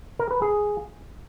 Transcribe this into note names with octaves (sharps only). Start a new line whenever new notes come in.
A#4
B4
G#4